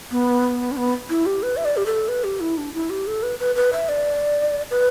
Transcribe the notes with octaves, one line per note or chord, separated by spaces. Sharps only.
B3
D4
B3
E4
G4
B4
E5
D5
G4
A4
B4
G4
E4
D4
E4
G4
A4
B4
B4
B4
E5
D5
B4